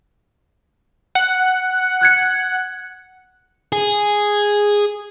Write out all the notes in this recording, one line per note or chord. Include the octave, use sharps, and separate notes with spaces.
F#5
F#6 G#6 C#7
G#4